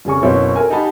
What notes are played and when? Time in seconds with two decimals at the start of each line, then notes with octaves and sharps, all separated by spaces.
0.05 F1 C#3 G#5 C#6
0.23 F#1 B2 C4 E4 C#5
0.56 A4 A#4 G#5
0.70 D#4 G4 F#5 G#5 A5 B5